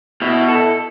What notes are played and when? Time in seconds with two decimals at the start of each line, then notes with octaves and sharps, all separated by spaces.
0.22 B2 E4
0.48 A4